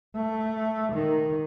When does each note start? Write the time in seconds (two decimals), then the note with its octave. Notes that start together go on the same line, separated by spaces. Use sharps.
0.16 A3
0.93 D#3